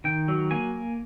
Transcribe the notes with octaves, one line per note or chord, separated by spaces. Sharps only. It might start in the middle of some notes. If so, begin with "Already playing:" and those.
D#3 G5
F#3
A#3 G#5